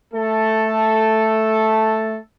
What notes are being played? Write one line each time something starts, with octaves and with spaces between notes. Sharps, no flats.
A3 A4